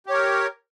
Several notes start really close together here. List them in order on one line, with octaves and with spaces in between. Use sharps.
G4 C#5 A#4